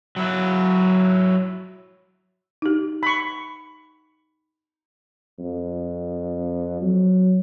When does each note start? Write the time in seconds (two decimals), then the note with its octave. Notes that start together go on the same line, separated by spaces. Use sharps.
0.16 F#3 E4
2.62 D#4 G4
3.03 B5 C#6
5.39 F2
6.82 F#3